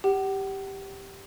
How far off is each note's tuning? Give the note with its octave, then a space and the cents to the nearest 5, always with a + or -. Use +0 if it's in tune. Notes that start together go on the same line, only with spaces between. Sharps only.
G4 +0 F#5 +40